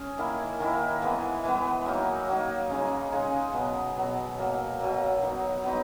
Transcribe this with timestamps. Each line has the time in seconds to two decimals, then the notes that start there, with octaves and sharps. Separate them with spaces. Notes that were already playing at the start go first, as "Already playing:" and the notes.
Already playing: C#4 G#4
0.18 D#3 A#3 E4
0.60 D#3 A#3 E4
1.02 E3 G#3 B3
1.44 E3 G#3 B3
1.86 F#3 A#3 D#4
2.28 F#3 A#3 D#4
2.70 C#3 G#3 D#4 G#4
3.12 C#3 G#3 D#4 G#4
3.53 B2 F#3 B3
3.97 B2 F#3 B3
4.39 B2 F#3 A#3
4.80 B2 F#3 A#3
5.23 F#3 B3 D#4
5.64 F#3 B3 D#4